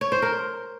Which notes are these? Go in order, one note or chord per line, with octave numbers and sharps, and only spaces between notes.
C#5
C5
A#4